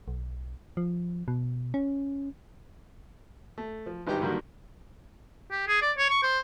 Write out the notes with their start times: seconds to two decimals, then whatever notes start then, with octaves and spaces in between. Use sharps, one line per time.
0.08 B1
0.77 F3
1.28 B2
1.74 C#4
3.58 A3
3.86 F3
4.07 G#1 G2 D#4 G4 G5 A#5
4.21 G2 D3 D#3 F#3 G3 A#3
5.51 G4
5.67 G#4
5.82 D5
5.97 C#5
6.10 C#6
6.23 C5